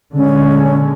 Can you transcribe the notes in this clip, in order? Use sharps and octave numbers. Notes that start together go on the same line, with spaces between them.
A#2 D3 G#3 C#4